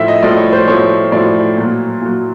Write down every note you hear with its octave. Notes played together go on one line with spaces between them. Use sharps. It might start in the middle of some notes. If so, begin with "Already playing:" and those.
Already playing: A2 F3 E5
D#5
A2 F3 D5
C#5
C5
A2 F3 C#5
A2 F3 D5
A#2 F#3
A#2 F#3